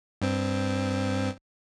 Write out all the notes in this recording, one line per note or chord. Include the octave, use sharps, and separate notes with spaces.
G2 C4